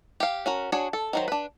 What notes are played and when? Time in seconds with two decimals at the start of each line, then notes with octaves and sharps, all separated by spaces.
0.20 G4 F5
0.46 C#4 F#4 A#4
0.72 D4 F#4 G#4 C#5
0.93 A4
1.13 D#3 F#3 C5
1.28 D4 B4